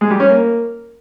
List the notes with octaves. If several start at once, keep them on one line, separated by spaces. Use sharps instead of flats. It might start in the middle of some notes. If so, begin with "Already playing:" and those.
G#3
G3
C#4
A#3